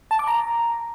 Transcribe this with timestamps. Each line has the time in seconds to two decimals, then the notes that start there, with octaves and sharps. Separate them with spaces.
0.11 A5
0.19 D6
0.27 A#5